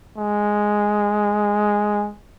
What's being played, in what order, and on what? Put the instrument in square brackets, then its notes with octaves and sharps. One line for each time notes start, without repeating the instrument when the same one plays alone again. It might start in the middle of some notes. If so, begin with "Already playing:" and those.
[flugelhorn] G#3